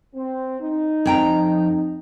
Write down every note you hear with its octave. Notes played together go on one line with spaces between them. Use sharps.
C4
D#4
F2 G5 A#5